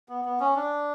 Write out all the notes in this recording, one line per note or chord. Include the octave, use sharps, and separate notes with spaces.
B3
B3
C#4
D4